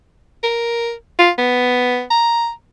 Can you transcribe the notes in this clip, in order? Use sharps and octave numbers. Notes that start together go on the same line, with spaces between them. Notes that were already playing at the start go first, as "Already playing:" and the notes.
A#4
F4
B3
A#5